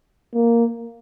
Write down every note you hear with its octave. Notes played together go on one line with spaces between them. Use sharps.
A#3